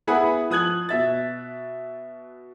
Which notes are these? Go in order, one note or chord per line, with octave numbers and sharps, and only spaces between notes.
B3 E4 G#4 B4 F#5 B5
F3 D#6 F#6 G#6 F#7
B2 E5 A6